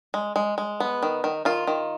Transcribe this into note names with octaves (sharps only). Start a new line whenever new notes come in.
G#3
G#3
G#3
B3
D#3
D#3
D#3 F4
D#3